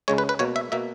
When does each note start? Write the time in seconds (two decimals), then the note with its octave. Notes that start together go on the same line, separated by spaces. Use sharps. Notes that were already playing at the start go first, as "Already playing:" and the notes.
0.08 C#2 C#3 G#3 C#5
0.18 B4
0.29 B4
0.39 B2 A#3 C#5
0.56 E5
0.72 B2 A#3 E5